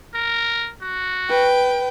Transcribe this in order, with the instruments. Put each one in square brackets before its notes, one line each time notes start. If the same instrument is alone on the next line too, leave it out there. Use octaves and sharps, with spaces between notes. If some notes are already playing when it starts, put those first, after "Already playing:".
[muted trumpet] A#4
F#4
[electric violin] B4 [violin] G5